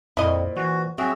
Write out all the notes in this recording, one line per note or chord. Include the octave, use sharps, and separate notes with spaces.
F2 A#2 C4 E4 D#5
E3 F#4
F#3 C4 F#4 G#4 E5